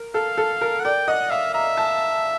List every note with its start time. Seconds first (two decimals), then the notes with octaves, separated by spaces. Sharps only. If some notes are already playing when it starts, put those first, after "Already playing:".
Already playing: A#4
0.14 A4 F5
0.38 A4
0.61 A#4
0.80 F#5
0.84 D5 G5
1.08 D#5 F#5
1.31 E5 F5
1.54 E5 A#5
1.77 A5